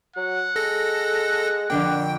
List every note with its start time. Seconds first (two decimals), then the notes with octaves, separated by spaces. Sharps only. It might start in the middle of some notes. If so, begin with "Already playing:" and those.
0.16 F#3 F#5
0.56 G#3 A4 A#6
1.70 F2 A#2 D3 D4 G5